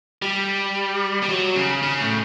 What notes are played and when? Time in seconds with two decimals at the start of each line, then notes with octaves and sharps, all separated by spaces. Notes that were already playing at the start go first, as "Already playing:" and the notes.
0.22 G3
1.23 G3
1.29 F#3
1.55 C#3
1.83 C#3
2.00 A2